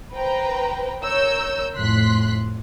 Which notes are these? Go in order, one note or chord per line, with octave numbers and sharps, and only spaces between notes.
B4 C5 G5 A#5
A#4 C#5 E6 G6
F2 A2 C6 F#6 B6